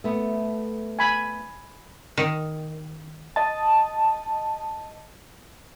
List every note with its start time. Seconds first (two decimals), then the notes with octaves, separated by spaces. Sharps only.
0.04 A3 B3
0.99 G#5 B5
2.18 D#3
3.36 D#5 A5